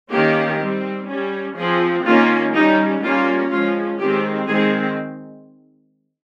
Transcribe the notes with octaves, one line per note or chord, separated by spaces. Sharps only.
D#3 A#3 C#4 G4
G3 C4
G3 C#4
F3 C4 G#4
D#3 A#3 C#4 F4
G3 C#4 D#4
G3 A#3 C#4 F4
F3 G#3 C#4 F4
D#3 G#3 C4 G4
D#3 G#3 C4 G#4